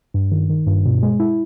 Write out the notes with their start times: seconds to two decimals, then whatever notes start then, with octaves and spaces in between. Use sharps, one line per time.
0.14 G2
0.31 D#3
0.49 D#3
0.67 G2
0.86 B2
1.03 G#3
1.20 E4